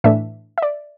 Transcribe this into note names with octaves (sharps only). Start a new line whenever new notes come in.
A2 E3 A3 D4 E5
E5
D5